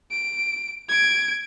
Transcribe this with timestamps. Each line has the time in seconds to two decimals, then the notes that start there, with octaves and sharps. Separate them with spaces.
0.11 D7
0.89 G#6 D7